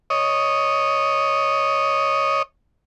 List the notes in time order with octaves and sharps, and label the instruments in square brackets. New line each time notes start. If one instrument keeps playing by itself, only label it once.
[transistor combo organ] C#5 D#5